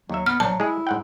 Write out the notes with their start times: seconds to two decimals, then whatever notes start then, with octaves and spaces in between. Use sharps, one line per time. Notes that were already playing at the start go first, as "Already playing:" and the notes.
0.10 D#2 F#3 E5
0.26 B3 F6
0.40 A#1 F#3 A5
0.60 G#3 E4 G#4
0.87 G#2 F#5 G5